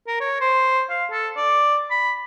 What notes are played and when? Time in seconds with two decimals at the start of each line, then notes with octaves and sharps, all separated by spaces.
0.07 A#4
0.21 C#5
0.41 C5
0.90 F5
1.11 A4
1.37 D5
1.91 B5